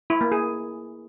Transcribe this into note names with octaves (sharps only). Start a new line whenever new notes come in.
E4
A#3
G#4